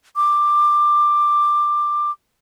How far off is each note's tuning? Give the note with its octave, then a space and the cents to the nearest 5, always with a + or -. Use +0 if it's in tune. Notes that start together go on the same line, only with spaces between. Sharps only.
D6 +15